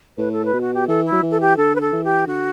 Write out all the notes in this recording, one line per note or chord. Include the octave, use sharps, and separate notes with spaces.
A2 B4
A4
B4
B2
F#4
G4
E3 A4
E4
F#3
E3
A4
G4
D3 A4
B4
A4
E3
G4
D3 F#4